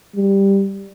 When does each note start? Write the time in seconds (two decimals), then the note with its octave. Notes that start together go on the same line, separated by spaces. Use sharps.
0.16 G3